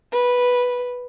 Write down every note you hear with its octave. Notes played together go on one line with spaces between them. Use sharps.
B4